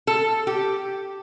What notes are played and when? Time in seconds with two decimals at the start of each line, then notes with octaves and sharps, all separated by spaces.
0.07 A4
0.47 G4